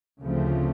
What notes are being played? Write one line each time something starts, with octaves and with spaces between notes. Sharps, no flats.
D2 C#3 F3 A3 C4